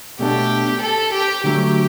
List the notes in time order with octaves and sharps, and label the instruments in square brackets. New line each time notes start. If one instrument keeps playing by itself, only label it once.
[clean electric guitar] B2 A3 D4 A4 [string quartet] G4
[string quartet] A4
G4
[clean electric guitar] D3 F#3 A3 [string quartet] G4